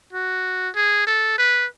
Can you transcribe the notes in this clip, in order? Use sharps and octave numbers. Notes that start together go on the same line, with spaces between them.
F#4
G#4
A4
B4